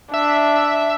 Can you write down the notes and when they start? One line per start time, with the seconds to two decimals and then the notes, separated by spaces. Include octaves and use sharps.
0.14 D4 E5